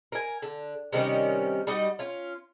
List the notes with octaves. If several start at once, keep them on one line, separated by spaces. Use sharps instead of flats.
A#4 G#5
D3
C3 D#3 G3 C#4
G3 D#4 F#4 D#5
C#4 F4